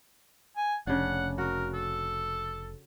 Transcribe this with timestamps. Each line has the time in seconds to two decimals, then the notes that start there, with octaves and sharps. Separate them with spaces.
0.56 G#5
0.87 F1 C#3 D4 F#5
1.38 F#4 A#4
1.74 A4